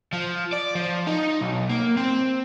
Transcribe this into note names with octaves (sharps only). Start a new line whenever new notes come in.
F3
D5
F3
D#4
B1
A#3
C4